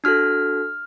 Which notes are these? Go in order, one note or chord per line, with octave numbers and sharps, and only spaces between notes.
D4 F#4 A4 F6